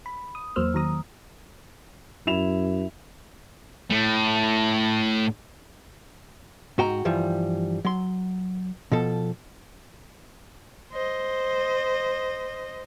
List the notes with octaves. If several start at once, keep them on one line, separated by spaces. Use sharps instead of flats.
B5
D#6
E2 F#3 A#3 C5 E6 F6
D#3 F#3 A#5 D#6
F#2 E4 E7 F7
A2 A3
G#2 F#4 G5 A#5
G2 E3 F3 G3
F#3 C6
B2 F3 A4
C5 D#5